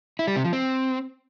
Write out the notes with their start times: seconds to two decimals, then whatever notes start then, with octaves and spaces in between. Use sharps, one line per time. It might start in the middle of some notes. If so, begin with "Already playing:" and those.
0.19 E4
0.28 G3
0.36 C3
0.44 F3
0.53 C4